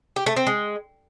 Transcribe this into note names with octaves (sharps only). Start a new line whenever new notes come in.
G4
A3
C4
G#3